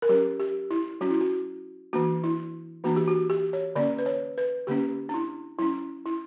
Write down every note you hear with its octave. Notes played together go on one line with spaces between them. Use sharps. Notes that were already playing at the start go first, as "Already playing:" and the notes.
A#4
F#3 C#4 G4
G4
E4
F#3 C#4 F#4
E4
F#4
E3 A#3 D4 F#4
E4
E3 A#3 D4 F#4
G4
F#4
G4
C#5
D3 A#3 C#4 D5
B4
C#5
B4
D3 A#3 C#4 G4
D4
E4
F#3 C#4 E4
E4